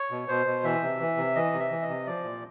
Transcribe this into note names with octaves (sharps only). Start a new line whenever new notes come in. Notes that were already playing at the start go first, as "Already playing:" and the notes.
Already playing: C#5
B2
B2 C5
B2
E3 E5
C3
E3
C3
E3 D#5
C3
E5
E3
D#5
C3
F3 D5
A#2